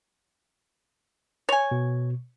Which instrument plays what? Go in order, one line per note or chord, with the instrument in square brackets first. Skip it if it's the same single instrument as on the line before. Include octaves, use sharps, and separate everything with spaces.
[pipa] C#5 G#5
[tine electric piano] B2